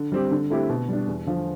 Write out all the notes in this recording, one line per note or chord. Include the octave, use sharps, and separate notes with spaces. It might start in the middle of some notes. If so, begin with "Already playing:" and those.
Already playing: D3
G3 C4 G4
D3
A3 C4 E4 G4
B2
G3 D4
E2
D3 F3